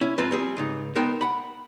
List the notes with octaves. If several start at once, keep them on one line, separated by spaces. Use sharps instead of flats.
C#4 E4
G#2 F3 C4 F4 B4 C5
G3 C4 G#4
C#2 G#2 D#4
G#3 B3 D#4 A#4 C5 G5
F#5 B5